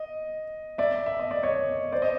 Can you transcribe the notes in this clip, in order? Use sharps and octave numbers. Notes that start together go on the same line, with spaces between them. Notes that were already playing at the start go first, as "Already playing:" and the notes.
Already playing: D#5
D5 E5
E5
D#5
D5
C#5 D#5
C5 D5
D#5